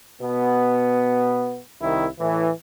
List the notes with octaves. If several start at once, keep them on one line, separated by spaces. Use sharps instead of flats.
B2 B3
C2 D#3 E4
A2 E3